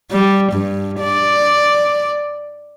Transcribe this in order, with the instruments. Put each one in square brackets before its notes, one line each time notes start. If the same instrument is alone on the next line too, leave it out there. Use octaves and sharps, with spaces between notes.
[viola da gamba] G3
G2
D5